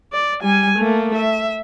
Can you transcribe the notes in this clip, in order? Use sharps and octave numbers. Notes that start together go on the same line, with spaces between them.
D5
G3 G#5
A3 A#3
E5